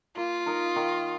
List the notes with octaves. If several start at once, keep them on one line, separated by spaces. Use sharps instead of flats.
A#3 F4
D#4 A#4
D#3